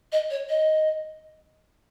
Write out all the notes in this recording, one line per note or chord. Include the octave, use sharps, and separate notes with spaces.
D#5
C#5
D#5